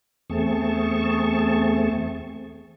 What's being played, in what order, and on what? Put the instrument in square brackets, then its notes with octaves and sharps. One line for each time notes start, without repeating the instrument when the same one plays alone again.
[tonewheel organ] E2 A3 C4 G#4 A5 C#6